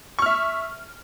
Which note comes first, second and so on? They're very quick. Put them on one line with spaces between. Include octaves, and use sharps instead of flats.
C#6 F6 E5